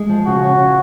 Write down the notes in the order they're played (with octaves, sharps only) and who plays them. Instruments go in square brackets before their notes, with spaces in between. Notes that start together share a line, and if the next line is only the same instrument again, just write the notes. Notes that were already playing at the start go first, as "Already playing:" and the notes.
Already playing: [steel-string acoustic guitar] G#3
F3
[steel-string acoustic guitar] C#3 [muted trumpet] F#4
[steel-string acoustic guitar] C#4
C#3